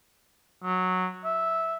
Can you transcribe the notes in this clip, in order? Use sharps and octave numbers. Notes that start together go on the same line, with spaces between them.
F#3
E5